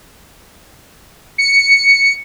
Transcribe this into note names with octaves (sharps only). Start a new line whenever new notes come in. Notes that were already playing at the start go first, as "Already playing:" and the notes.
C#7